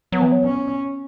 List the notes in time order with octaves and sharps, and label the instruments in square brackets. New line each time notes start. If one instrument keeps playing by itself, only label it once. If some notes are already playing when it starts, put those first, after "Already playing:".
[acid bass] F#3 [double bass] B3
[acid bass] E3
F#3
[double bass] C#4